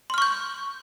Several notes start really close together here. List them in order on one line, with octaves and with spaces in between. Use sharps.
C6 F6 C#6 G6